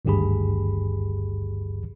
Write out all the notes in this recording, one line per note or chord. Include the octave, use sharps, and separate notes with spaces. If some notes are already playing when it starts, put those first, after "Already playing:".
G#1 D2 G2 G4 G#4 B5